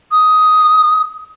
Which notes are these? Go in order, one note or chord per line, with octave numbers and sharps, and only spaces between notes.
D#6